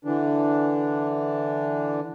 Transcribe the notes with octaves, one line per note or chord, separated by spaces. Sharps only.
D3 E3 D4